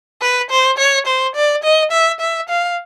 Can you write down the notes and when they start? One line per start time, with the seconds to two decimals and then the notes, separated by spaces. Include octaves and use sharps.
0.21 B4
0.50 C5
0.78 C#5
1.06 C5
1.35 D5
1.63 D#5
1.92 E5
2.20 E5
2.49 F5